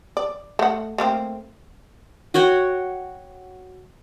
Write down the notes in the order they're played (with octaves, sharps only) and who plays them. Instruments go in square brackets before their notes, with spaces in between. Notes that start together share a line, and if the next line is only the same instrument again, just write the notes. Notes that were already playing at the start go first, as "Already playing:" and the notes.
[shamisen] D5
A3 F#5
A3 A#3 C4
[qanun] F#4 C#5 F#5 G5